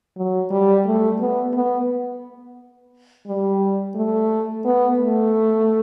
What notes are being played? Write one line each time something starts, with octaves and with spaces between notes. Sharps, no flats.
F#3
G3
A3
B3
B3
G3
A3
B3
A3